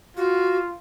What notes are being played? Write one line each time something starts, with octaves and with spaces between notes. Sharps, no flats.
F4 F#4